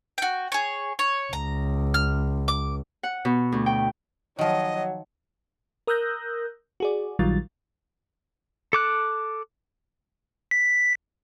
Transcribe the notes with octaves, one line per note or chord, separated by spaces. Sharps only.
F#4 G5
G#4 C#5
C#5
C#2 A#5
F6
D6
F#5
B2
D2
G5
D#3 F3 F#3 D#5
A#4 D#6 E6 F#6 G6 A#6
F#4 G#4 D5
A#1 D#3 F#3 G3 F4 A6
A4 D6 F#6
B6